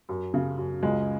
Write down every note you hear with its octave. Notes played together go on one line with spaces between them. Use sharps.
F#2
C#3
F#2
C#2 G#3